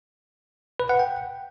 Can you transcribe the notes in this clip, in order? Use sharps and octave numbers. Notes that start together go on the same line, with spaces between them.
B4
F#5
G5